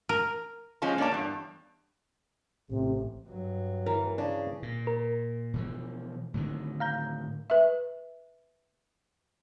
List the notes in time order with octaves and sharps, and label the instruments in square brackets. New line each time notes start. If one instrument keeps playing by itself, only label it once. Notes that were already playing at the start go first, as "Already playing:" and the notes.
[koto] A#4
[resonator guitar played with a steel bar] F3 G#3 C#4 F4 A5
A#3 D4 A#4 C#5 D5 A5
E2 G2
[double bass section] A1 [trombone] C3
[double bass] G2 F#3
[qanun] E3 [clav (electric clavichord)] A#4
[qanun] C#3 [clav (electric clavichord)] D4
[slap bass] A#2
[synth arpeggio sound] A#4
[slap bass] B2 E3 F3
A2 D3 D#3
[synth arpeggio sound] F5 A#5 G6
[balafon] B4 E5